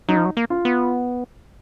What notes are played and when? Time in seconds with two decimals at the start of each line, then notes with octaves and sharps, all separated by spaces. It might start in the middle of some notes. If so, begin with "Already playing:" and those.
0.08 F#3 D#4
0.17 F3
0.25 F#3
0.37 A#3
0.50 F4
0.65 B3